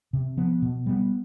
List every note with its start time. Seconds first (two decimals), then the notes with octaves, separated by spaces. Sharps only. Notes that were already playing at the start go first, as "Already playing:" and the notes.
0.13 C3
0.37 F3 B3
0.62 B2
0.86 G3 B3